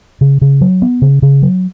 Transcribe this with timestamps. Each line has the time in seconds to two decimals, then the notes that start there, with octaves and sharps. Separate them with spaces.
0.21 C#3
0.41 C#3
0.61 F#3
0.82 B3
1.02 C#3
1.22 C#3
1.42 F#3